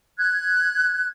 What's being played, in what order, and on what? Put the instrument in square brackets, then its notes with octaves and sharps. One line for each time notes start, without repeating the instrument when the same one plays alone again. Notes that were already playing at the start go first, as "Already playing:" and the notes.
[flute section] F#6 G#6